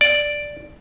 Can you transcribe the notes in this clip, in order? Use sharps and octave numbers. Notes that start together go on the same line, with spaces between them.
D5